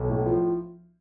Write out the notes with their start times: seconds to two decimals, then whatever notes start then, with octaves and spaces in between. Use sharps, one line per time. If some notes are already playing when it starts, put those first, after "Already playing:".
Already playing: B1
0.09 A2
0.26 F3